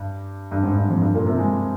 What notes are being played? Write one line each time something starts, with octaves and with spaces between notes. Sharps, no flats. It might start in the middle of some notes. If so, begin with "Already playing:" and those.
Already playing: G2
G2
G#2
G2
F2
G2
A#2
C3
G#3